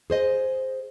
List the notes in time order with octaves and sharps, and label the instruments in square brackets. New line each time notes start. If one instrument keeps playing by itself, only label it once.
[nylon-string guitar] G#4 C5 D#5